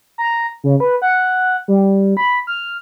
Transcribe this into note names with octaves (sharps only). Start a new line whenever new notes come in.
A#5
C#3
B4
F#5
G3
B5
F6